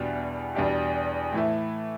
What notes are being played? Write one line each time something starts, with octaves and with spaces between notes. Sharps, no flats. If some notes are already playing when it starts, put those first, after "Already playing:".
Already playing: E2 B2 G3 D4 G4
E2 B2 G3 D4 G4
A2 E3 A3